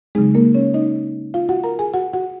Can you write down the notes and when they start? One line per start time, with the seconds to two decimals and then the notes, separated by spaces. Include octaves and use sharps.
0.15 C#3 F#3 G#3 C4 D#4 G#4
0.35 A#3 A#4
0.55 C#4 C#5
0.74 D#4 D#5
1.34 F4 F5
1.49 F#4 F#5
1.64 A#4 A#5
1.79 G#4 G#5
1.94 F#4 F#5
2.13 F#4 F#5